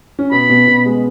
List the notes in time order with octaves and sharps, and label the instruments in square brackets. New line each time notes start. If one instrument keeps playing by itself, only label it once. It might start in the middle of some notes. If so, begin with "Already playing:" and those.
[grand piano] C#4
[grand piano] B2 B3 [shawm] B5
[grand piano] B2 B3
B2 B3
G#3